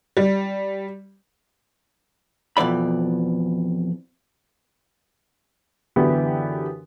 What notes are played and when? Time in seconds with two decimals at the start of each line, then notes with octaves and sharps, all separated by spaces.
0.17 G3
2.57 F2 B2 E3 D5 B5
5.96 F#2 D3 E3 B3 G4